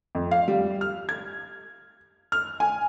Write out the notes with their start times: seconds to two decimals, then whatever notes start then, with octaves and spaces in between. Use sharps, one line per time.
0.15 F2
0.31 F5
0.48 G3
0.81 F6
1.09 G#6
2.32 F6
2.60 G#5